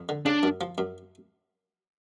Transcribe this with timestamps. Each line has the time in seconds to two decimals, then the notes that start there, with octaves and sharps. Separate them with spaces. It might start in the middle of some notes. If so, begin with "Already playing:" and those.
Already playing: F2
0.09 D3
0.26 C#3 D4
0.43 F#2
0.61 F3
0.78 F#2